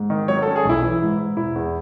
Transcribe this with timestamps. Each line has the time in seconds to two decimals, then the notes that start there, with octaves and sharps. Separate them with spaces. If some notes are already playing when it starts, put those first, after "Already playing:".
Already playing: G#2
0.10 D#3
0.28 F#3 C#5
0.42 A4
0.47 C#4
0.56 G#4
0.65 B1 E4
0.82 E3 E4
1.01 G#2
1.19 G#2
1.37 E1 E4
1.55 E2